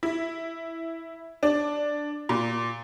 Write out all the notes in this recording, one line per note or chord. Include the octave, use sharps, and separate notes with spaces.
E4
D4
A#2